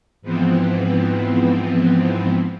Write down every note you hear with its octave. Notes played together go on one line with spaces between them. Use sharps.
G#2 E3 F3 B3 C4